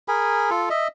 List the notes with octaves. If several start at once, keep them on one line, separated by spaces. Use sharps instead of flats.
G#4 A#4 G#5 B5
F4 A4
D#5 E5